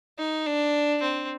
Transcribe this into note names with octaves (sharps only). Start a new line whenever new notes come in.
D#4
D4
C4